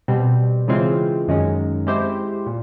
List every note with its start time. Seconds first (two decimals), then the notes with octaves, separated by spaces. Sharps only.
0.08 B2 G3 C4
0.68 C#3 E3 G#3 C4 F4
1.28 F#2 D#3 G#3 C#4
1.87 G#3 C4 E4 G4 C5
2.47 A#2